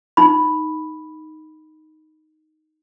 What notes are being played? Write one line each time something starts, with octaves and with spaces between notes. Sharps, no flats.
D#4 B5